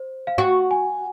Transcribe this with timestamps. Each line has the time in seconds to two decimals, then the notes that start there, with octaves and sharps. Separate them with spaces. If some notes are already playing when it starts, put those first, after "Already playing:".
Already playing: C5
0.27 F5
0.38 F#4 F#5
0.71 G#5